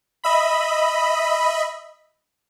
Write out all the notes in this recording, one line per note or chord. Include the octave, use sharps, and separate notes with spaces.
D#5 E5 B5